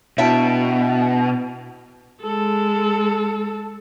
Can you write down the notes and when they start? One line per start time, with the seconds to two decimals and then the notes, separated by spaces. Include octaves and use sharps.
0.18 B2 D4 E4 F#4 E5 G5 A5
2.22 G#3 A4